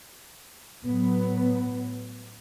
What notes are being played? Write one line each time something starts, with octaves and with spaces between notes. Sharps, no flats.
A2 F#3 B3